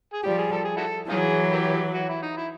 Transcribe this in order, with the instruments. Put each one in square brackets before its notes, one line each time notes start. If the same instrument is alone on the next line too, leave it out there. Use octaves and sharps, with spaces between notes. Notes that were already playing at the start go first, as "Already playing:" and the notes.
[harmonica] G#4
[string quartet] F3 G3 [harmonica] G4
[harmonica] G#4
A4
G#4
E4 F#4 A4
[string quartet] E3 F#3 [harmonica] D#4 F4 G#4
[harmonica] A#3 E4 G4
F#4
E4
D#4
E4